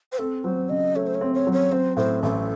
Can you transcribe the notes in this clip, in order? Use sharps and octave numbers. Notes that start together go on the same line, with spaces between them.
C5
C4 A4
F#3 C5
C#3 D#5
A3 C#5
C5
C#5
C4
C#5
F#3
C#5
C4 C5
A2 C5
A1 A4